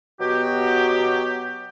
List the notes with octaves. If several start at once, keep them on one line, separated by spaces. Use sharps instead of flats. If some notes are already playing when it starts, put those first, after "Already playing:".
B2 F#3 B3 F#4 G4